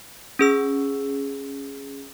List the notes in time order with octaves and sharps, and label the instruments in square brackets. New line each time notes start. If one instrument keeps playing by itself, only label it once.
[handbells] C#4 G#4 E6